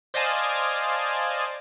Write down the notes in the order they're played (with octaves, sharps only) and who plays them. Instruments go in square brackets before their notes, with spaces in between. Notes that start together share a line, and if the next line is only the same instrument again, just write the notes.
[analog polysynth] C5 D5 D#5 F5 G#5 A5